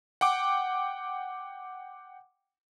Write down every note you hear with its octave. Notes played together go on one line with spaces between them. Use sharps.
F#5 G5 D6